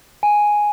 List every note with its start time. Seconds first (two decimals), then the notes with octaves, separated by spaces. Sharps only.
0.23 G#5